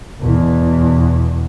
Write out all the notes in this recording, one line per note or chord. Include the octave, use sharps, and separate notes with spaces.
E2 B2